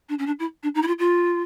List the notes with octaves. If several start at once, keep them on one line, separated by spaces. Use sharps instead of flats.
D4
C#4
D4
E4
D4
D#4
E4
F4
F4